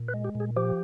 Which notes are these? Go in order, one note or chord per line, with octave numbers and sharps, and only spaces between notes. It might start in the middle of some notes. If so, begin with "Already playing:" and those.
Already playing: A#2
B4
G#3
G4
A#2
G#4
F3 G4